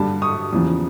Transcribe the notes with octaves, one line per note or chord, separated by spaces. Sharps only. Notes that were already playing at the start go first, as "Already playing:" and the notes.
Already playing: G2 D3 G3 A5 B5
C#6 D#6
E2 C#3 F3